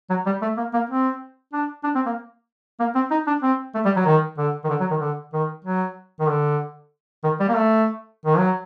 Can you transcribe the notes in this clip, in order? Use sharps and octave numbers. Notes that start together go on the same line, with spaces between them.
F#3
G3
A3
A#3
A#3
C4
D4
D4
C4
A#3
A#3
C4
D#4
D4
C4
A3
G3
F#3
D#3
D3
D#3
D3
F#3
D#3
D3
D#3
F#3
D#3
D3
D#3
G3
A#3
A3
D#3
F#3